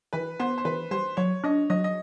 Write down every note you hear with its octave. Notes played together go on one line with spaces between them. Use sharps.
E3 B4
B3 C5
C5
E3 B4
G3 C5
F#3 C#5
D4 D#5
F#3 D#5
D#5